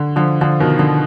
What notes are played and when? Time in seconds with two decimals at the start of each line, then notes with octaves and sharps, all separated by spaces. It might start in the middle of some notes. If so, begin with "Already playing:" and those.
Already playing: D3
0.16 D3 F3
0.41 D3 F3
0.60 B2 D#3
0.79 D3